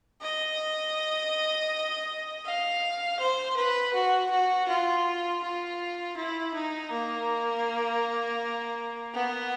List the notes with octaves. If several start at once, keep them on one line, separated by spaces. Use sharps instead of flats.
D#5
F5
C5
B4
F#4
F#4
F4
F4
E4
D#4
A#3
B3